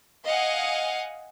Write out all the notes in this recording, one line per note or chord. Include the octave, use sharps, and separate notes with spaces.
D#5 F5 F#5 G#5